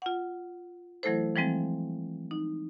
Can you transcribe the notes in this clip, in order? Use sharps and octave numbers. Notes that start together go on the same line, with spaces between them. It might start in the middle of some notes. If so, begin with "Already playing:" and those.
F4 F#5
E3 F#3 A3 E4 A4 C5
E3 F3 G3 G#3 C4
D#4